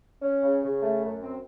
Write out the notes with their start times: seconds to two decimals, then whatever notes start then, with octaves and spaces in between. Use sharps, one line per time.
0.22 C#4
0.42 C#3
0.62 C#3
0.82 A3
1.02 F#2
1.22 C4